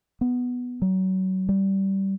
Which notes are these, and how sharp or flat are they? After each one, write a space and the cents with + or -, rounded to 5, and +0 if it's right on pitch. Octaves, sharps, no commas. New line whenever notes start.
B3 +0
F#3 +25
G3 -15